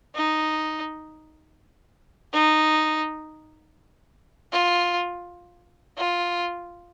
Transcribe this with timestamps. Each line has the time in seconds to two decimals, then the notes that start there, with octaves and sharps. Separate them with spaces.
0.15 D#4
2.33 D#4
4.53 F4
5.98 F4